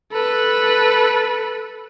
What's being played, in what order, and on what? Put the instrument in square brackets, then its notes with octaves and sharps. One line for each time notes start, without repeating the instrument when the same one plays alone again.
[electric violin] A4 B4